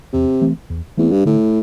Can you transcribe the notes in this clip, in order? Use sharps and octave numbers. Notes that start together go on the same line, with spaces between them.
E2 C3
E3 A3 C4
E2
E2 E3 A3 C4
G2
A2 D3